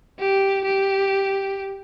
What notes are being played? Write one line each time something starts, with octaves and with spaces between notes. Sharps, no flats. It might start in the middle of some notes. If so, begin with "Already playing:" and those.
G4
G4